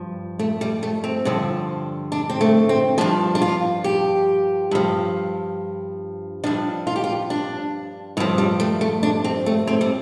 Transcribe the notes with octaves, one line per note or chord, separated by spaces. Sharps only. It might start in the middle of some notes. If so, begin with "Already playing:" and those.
Already playing: G2 F3
A3
G3
A3
C4
G2 D3 F3
D4
C4
A3
C4
G2 F3 D4
D4
F4
G4
G2 F3
G2 F3 D4
F4
G4
F4
D4
G2 F3 C4
G3
A3
A3
D4
C4
A3
C4
G3